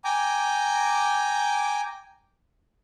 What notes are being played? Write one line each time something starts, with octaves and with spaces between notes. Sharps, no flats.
G5 G#5 A#5 D6